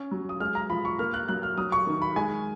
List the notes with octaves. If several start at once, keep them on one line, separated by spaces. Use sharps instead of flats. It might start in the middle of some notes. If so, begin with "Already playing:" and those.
Already playing: C#4
F#3
D#6
G#3 F6
A#5
F3 B5
C#6
A#3 F6
F#6
F#3 F#6
F6
F#3 D#6
C#6
D#3
B5
G#3 G#5